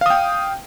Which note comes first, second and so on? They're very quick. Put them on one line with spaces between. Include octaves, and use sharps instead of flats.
F5 D#6 G5